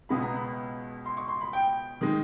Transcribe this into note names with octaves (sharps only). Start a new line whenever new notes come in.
C#2 B2 G#3 B3 B5
A#5
B5
C6
C#6
C6
B5
G5
D#3 G#3